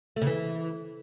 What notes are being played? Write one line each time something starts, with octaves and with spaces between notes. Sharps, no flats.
A3
C#3
E3